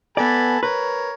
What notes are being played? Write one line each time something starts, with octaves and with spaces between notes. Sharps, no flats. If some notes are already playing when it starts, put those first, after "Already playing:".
B3 A4 D5 G#5 B5
A#4 B4 C#5